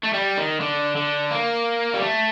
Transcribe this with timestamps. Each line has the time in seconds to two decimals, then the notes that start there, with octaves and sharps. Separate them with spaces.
0.04 A3
0.14 G3
0.37 D#3
0.61 D3
0.96 D3
1.31 A#3
1.94 G3
2.01 A3